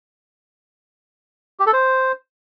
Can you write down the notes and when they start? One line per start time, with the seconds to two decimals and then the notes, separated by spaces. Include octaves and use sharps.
1.60 G4
1.66 A4
1.73 C5